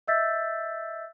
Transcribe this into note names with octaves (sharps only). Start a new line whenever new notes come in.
D#5 E5 E6 G6 A6 B6